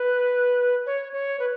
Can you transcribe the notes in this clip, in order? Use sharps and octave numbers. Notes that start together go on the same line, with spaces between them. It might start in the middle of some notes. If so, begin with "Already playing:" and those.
Already playing: B4
C#5
C#5
B4